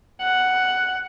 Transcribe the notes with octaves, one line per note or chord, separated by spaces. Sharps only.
F#5